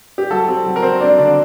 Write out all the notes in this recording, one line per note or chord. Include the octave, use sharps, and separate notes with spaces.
G4
F#3 A4
C4
F#3
A#4
F#3 C4 C5
C4 D4 D5
D3 D4 D5